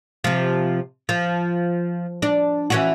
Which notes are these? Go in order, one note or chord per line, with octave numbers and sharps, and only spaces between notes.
C3 F3
F3
D4
E3 C#4 F#4